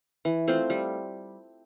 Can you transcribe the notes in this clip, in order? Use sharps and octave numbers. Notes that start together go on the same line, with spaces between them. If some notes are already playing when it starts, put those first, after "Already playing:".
E3
A3 C4 F4
G3